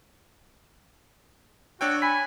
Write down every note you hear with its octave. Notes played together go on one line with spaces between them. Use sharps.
D4 F#4 C#5 G5 E6
G#5 B5 B6